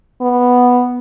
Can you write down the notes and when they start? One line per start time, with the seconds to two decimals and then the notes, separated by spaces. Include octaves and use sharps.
0.21 B3